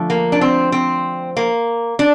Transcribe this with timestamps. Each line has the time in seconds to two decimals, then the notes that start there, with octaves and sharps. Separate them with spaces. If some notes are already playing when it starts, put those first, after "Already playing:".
Already playing: D3 F3 A3
0.10 A#3
0.32 D4
0.41 C4
0.72 C4
1.37 A#3
1.99 D4